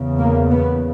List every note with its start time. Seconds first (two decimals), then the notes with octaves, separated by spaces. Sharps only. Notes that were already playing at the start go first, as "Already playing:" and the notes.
Already playing: E2 C#3
0.19 A#3
0.51 B3